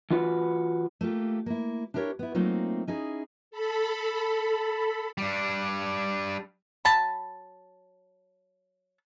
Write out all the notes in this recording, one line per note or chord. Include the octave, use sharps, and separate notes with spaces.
E3 F4 F#4 B4
A3 A#3 F4 G4
A#3 E4
D4 E4 G4 A#4 C5 C#5
B3 E4
F#3 A3 A#3 C4 D#4 F4
C#4 D#4 E4 G#4
A4 B5
G3 D4
F#3 A5 B5